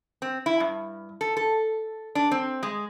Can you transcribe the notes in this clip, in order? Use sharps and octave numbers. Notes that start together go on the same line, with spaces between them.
C4
E4
G2
A4
A4
D4
C4
G#3